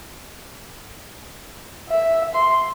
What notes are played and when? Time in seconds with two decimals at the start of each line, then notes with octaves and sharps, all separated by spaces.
1.89 E5
2.35 C6